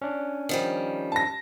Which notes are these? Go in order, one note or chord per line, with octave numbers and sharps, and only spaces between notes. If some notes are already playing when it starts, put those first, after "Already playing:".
C#4 D4
D#3 F3 G3
A5 A#6